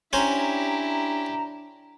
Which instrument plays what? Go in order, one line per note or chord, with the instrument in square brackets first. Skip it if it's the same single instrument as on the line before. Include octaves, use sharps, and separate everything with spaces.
[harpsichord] C#4 C5 [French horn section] D4 [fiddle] E4 G4 [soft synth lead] A#5